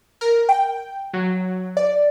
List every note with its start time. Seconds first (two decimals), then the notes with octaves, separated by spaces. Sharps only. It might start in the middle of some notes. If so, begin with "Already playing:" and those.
0.21 A#4
0.49 G5
1.13 F#3
1.77 D5